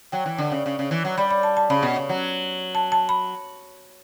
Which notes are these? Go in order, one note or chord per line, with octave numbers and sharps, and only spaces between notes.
F#3 G5
E3
D3
C#3
C#3
C#3
E3
F#3
G3 B5
B5
A5
A5
C#3 B5
B2
C#3
F#3
A5
A5
B5